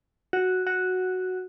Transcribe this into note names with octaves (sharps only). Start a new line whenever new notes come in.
F#4
F#4